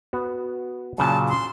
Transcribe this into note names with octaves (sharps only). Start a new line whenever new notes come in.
B3 F#4
A#2 C#3 F#3 A5
C6